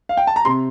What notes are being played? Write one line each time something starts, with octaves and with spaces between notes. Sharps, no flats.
F5
G5
A5
A#5
C3 C6